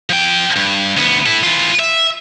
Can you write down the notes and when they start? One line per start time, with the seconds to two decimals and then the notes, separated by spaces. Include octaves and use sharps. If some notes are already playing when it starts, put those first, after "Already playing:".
0.10 F3 G5
0.56 G2
0.97 D2 B3
1.26 E4 A4
1.43 E3 F4
1.79 E5